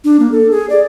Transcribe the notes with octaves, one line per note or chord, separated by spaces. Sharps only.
D4
A#3
A4
G#4
D5